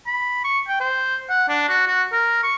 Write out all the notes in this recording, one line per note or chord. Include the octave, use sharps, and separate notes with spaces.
B5
C#6
G5
C5
F#5
D4
F#4
F#4
A#4
C#6